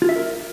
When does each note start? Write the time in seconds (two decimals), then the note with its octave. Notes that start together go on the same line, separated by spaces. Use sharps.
0.02 F4
0.09 E5
0.16 A#4